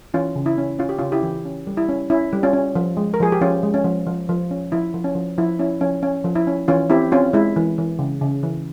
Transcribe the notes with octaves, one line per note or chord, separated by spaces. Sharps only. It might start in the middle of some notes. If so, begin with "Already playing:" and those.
E3 C#4 F4
C#3
E4
C#4
C#4 F4
G4
C#3 C#4 F4
E4 G4
E3
C#4
G3
E4
C#4
C#4 E4
G3
C#4 F4
C#4
F3
G#3
A#4
F3 G#4
G4
F3 C#4 F4
G#3
C#4
F3
F3
F3
C#4
F3 E4
F3
C#4
F3
F3 E4
C#4 E4
F3 C#4
C#4
F3
E4
C#4
E3 C#4 F4
C4 E4 G4
C4 C#4 F4
G#3 E4
E3
E3
C#3
C#3
E3